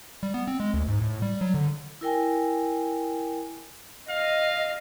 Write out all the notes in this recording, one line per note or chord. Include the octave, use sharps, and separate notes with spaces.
G3
B3
C4
G#3
D2
G#2
A2
G3
F#3
D3
E4 A#4 G5 G#5
D#5 F5